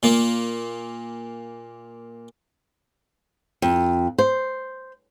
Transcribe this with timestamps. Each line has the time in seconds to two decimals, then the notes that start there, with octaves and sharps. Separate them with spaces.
0.03 A#2 A#3
3.62 F2
4.18 C5